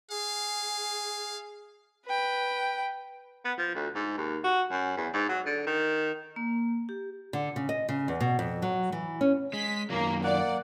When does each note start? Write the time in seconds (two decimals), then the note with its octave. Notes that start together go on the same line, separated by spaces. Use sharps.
0.11 G#4 F5
2.06 B4 G5
3.45 B3
3.58 F3
3.75 D2
3.95 G#2
4.17 D#2
4.44 F#4
4.71 F#2
4.97 E2
5.13 G#2
5.29 F#3
5.46 D3
5.67 D#3
6.36 A#3
6.89 G4
7.33 D3
7.56 C#3
7.69 D#5
7.89 C#3
8.08 E2
8.20 B2
8.39 F2
8.62 F#3
8.92 E3
9.21 C#4
9.53 G#3 B6
9.90 F#2 D#3 F#3 A#3
10.24 A#3 D5 F#5